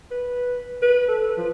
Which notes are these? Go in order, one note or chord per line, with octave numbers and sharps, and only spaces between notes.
B4
B4
A4
F3